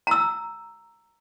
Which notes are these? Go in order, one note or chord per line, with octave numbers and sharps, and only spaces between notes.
A#5 E6